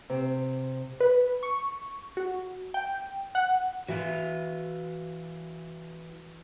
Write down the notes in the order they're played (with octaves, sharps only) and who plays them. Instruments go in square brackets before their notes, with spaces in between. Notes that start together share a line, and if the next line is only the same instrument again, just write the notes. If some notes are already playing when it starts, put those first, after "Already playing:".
[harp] C3
[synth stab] B4
C#6
F#4
G5
F#5
[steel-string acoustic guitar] E3 [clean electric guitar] F#4 E5 F5